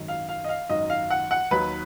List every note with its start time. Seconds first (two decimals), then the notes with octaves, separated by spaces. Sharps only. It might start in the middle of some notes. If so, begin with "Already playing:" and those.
Already playing: G#1 F#2 D#3
0.08 F5
0.29 F5
0.44 D#5
0.49 F5
0.70 G#1 F#2 D#3 D#5
0.90 F5
1.10 F#5
1.31 F#5
1.51 D#2 D#3 F#3 B4